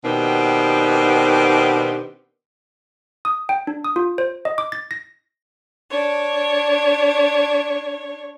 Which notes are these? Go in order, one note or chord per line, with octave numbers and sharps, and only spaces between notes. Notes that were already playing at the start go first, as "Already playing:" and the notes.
B2 D#3 B3 C4 D4 G4
D#6
G5
D4
D#6
F4
C5
D#5
D6
A6
A#6
D4 C#5